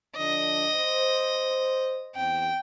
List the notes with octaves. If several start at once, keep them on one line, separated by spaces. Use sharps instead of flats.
D3 F3 D4 D#5
C5
E2 C4 G5